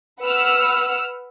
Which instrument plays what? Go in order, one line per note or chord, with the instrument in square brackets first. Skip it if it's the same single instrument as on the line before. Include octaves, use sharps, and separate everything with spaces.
[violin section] B4 F#5 E6 F6